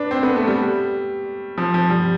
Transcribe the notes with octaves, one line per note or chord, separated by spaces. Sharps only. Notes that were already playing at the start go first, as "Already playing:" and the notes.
Already playing: D4 B4
C4
B3
A3
G3
F3
F3
G3